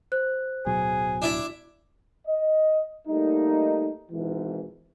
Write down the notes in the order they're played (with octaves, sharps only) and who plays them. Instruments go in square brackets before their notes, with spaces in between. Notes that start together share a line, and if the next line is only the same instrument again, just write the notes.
[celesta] C5 F#6
[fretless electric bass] D1 B2 F#3 [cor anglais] G#4
[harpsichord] D4 E4 D5
[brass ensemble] D#5
G3 A3 A#3 D#4
G#1 G#2 B2 E3